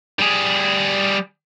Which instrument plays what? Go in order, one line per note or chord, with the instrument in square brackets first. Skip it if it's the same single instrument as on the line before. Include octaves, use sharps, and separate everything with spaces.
[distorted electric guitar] G3 G#4